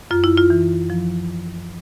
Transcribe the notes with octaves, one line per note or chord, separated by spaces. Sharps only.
F#2 F4
E4
F4
E3
F3